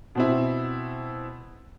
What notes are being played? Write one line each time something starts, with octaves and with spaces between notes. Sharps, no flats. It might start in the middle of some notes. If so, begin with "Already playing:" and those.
B2 C4 E4